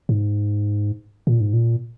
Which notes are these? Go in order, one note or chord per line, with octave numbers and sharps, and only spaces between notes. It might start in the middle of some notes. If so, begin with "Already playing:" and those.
G#2
A#2
G#2
A#2